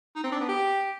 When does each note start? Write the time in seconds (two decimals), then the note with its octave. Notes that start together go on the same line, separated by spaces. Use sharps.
0.16 D#4
0.24 C4
0.32 D4
0.40 B3
0.49 G4